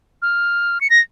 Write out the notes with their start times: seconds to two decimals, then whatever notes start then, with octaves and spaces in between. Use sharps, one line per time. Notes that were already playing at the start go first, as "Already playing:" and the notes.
0.22 F6
0.81 C#7
0.90 A#6